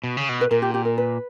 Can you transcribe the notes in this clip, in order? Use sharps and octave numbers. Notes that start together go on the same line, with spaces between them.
B2
C#3
B2
B4
A#2 A#4
G4
G4
A#4
B4